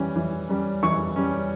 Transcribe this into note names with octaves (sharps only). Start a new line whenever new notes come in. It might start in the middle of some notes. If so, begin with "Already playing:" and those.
Already playing: E3 G3 C#4
E3
G3 C#4
E3 C#6
G3 C#4